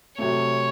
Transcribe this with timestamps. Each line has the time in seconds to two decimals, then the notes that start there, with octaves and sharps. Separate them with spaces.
0.18 C3 F#3 A3 C#5